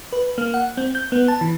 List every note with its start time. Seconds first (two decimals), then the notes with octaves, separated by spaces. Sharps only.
0.12 B4
0.38 A#3
0.54 F#5
0.77 C4
0.95 G6
1.12 B3
1.28 A5
1.41 E3